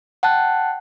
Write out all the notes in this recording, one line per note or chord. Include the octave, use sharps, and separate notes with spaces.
F#5 G5 A5 F#6